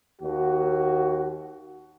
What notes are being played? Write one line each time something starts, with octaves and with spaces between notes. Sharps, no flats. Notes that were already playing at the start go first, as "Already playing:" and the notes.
D#2 F#4